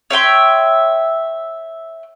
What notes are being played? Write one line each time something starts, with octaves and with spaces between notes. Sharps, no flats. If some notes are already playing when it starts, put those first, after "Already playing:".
C#5 E5 G5 C6